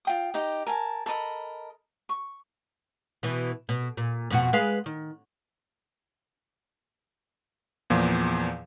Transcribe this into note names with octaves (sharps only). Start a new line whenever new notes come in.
F4 G5 D#6
D#4 G4 D#5
A#4 G#5 A5
A4 A#4 D#5 B5
C#6
B2 E3
B2
A#2
F2 B2 F#4
G#3 B4 F5
D#3
E2 A#2 F3